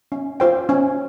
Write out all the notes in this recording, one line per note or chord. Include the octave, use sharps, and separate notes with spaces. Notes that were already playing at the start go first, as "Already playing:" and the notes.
C#4
F4 C5 G5
C#4